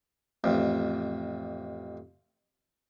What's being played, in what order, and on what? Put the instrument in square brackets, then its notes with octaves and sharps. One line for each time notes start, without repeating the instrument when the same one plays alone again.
[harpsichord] A1 F2